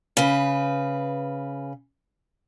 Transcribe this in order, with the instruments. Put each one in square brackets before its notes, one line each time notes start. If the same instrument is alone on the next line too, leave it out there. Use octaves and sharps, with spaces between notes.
[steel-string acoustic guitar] C#3 B4